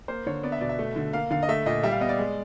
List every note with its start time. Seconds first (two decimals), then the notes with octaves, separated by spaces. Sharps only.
0.08 A#3 C5
0.26 D3 C#5
0.43 B3 D5
0.52 E5
0.61 B2 D5
0.69 E5
0.79 A3
0.96 D3
1.13 A#3 F5
1.31 D3 F5
1.43 D#5
1.48 A3 E5
1.66 A#2 D#5
1.83 G3 E5
1.91 F5
2.01 B3 D#5
2.09 D5
2.19 G#3